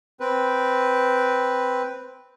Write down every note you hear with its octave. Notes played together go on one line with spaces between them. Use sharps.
C4 B4